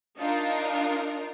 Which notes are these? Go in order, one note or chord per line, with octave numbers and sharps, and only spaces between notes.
D4 D#4 F4 A#4